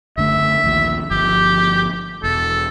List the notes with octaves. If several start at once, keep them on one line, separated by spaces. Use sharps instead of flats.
F#1 D3 A3 E5
A#1 D#2 A#2
G1 F3 G4
E1 A4